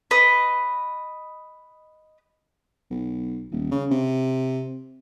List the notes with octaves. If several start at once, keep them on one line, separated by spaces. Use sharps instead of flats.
B4 D#5
B1
D#1
C#3
C3